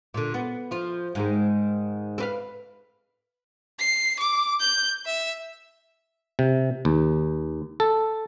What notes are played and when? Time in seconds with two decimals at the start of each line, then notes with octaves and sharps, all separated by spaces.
0.14 A#2 D3
0.34 B3
0.71 F3 F4
1.15 G#2 D#3 G#3
2.18 C4 B4 F5
3.79 C7
4.20 D6
4.60 G6
5.06 E5
6.39 C3
6.85 D#2
7.80 A4